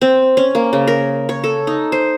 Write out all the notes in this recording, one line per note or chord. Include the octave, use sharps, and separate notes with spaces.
C4
C#4
A#3
C#3
A#4
C#5
A4
D#4
C5